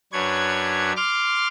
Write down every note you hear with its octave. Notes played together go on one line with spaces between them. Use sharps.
F#2 D4 B4 C#5 G#6
C6 D6 F6